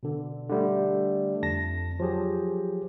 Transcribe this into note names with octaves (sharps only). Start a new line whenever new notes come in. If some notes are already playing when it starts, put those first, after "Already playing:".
B2 D3
D3 G3 A3
F2 A5 A#6
F3 F#3 G4 G#4